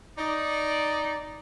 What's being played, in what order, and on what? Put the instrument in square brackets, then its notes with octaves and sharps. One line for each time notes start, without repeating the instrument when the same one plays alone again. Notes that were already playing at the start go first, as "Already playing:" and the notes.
[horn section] D#4 D5